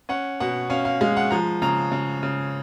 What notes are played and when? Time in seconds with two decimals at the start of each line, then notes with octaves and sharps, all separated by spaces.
0.09 C#4 F#5
0.40 B2 F#5
0.70 C#4 F5
0.85 F5
1.01 G#3 F5
1.17 F#5
1.31 F3 A#5
1.62 C#3 A#5
1.92 C#3
2.23 C#3